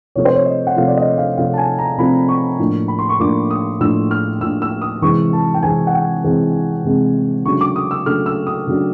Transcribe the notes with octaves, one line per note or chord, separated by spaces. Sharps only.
C3 F3 A3 C4 C#5
C5
C#5
D#5
F#5
C3 F3 A3 C4 F5
D5
D#5
F5
C3 F3 A3 C4 F5
A5
G#5
A#5
C3 F3 A3 C4 B5
C#6
A2 F3 A#3 D4
B5
C6
C#6
A2 F3 A#3 D4 D6
D#6
A2 F3 A#3 D4 E6
F6
A2 F3 A#3 D4 E6
E6
D#6
C3 E3 G#3 C4 C#6
A5
G5
C3 E3 G#3 C4 G#5
F#5
G5
C3 E3 G#3 C4
C3 E3 G#3 C4
C#3 F#3 A3 D4 C#6
D6
D#6
E6
C#3 F#3 A3 D4 F6
E6
D#6
C#3 F#3 A3 D4